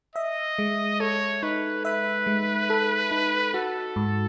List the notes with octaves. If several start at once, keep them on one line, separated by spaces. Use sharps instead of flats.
D#5 E5
G#3
A4 C#5
D#4 B4
B4 E5
G#3
A4
D#4
F#4 A4
G#2